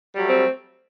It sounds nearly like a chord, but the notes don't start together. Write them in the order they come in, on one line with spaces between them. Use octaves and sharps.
G3 F#3 A3 C4